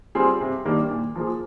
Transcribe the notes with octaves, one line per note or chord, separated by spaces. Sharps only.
G3 C4 F4 G#4
C3
D#3 G3 A#3 D4
A#2
F3 A#3 F4 G#4